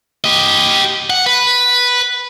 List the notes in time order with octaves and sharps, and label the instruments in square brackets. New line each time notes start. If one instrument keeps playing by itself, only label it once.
[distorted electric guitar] G4 D#5
F#5
B4